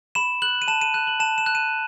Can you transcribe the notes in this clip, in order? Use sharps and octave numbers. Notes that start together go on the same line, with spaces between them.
B5 E7
F#6 F#7
D#7
A5 E7
D#7
F#6 E7
F#7
A5 E7
E7
F#6
D#7